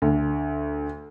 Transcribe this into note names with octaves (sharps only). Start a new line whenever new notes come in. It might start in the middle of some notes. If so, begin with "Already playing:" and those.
D2